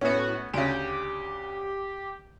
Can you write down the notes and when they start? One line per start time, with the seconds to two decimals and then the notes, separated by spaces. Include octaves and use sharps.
0.01 A2 B3 C#4 F#4
0.53 D2 C#3 G4